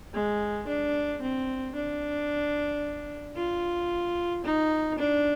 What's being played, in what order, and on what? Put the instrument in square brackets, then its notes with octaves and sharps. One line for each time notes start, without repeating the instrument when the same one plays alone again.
[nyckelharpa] G#3
D4
C4
D4
F4
D#4
D4